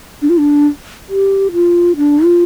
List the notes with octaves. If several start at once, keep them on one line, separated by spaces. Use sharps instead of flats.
D4
F4
D4
G4
F4
D4
F4